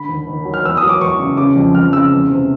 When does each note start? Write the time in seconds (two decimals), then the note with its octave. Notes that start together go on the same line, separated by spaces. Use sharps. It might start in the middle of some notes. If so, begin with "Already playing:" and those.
Already playing: D3 B5
0.09 D#2
0.28 D#2
0.45 F#3
0.54 F6
0.64 E2 E6
0.77 D#6
0.83 F#3
0.89 D6
1.01 E2 C#6
1.19 C#3
1.37 C#3 D6
1.56 F2
1.74 F2 F6
1.93 C#3 E6
2.12 E2
2.30 C3